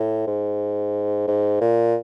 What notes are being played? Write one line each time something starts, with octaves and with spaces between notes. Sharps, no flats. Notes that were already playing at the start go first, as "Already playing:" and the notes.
Already playing: A2
G#2
G#2
A#2